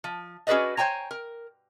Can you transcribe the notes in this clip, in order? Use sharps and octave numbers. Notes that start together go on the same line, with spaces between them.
F3
C#4 F#4 G#4 B4 D5 D#5
C5 C#5 G5 G#5 A#5
A#4